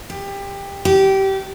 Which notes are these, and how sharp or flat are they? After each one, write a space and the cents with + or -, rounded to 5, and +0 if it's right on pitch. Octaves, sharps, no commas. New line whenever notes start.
G4 +20
G4 -20